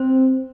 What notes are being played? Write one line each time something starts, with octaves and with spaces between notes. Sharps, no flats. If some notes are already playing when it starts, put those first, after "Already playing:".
Already playing: C4 C5